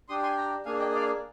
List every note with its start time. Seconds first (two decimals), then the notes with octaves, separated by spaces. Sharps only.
0.09 D4 G4 C6 D#6
0.23 G#5 C6
0.37 G5 A#5
0.65 A#3 D4 G#4 F5 G#5
0.79 D#5 G5
0.90 D#5
0.94 D5 F5